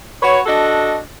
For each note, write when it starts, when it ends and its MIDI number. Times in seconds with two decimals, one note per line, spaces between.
0.23 0.40 66
0.23 0.40 71
0.23 0.40 73
0.46 0.99 62
0.46 0.99 66
0.46 0.99 69
0.46 0.99 75